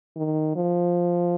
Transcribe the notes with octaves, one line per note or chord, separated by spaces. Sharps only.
D#3
F3